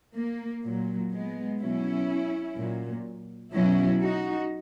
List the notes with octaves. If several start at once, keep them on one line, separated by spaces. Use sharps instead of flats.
A#3
A#2 F#3
G#3 B3
B2 F#3 C#4 E4
A#2 F#3
B2 F#3 C#4 E4
D#4 F#4